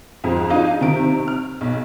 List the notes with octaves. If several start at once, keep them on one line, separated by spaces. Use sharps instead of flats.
F2 G#2 F3
D4 D#4 F4
C3 D#3 D7
F6
B1